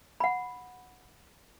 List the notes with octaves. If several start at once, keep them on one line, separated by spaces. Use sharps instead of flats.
F#5 B5